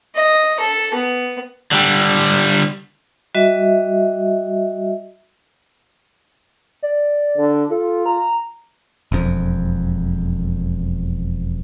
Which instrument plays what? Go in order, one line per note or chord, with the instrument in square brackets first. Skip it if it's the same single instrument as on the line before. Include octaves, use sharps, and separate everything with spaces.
[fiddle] D#5
A4
B3
[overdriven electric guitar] D3 G3
[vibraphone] G3 F#4 D#5 E5
[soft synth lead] D5
[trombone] D3
[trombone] F4 [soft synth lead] A4
[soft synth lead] A#5
[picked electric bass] E1 F2